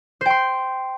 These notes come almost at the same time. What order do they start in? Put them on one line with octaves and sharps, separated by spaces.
C5 G5 C6